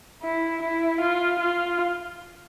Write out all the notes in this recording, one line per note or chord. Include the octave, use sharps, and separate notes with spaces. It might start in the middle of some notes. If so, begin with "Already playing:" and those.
E4
E4
F4
F4